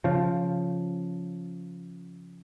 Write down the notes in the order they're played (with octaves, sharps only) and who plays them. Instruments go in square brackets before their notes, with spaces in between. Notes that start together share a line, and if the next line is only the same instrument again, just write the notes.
[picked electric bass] C#3 F3